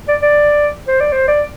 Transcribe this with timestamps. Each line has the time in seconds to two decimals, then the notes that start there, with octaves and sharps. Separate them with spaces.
0.08 D5
0.22 D5
0.88 C5
1.01 D5
1.12 C5
1.28 D5